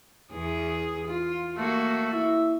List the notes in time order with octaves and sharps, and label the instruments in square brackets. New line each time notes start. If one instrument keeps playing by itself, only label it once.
[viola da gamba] E2 E3 G#4
F4
[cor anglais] A3 [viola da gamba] A#3 F#4
[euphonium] E4 [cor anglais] E5